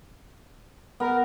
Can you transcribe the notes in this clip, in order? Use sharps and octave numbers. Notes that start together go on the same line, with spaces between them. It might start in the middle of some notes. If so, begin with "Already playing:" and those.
B3 A#4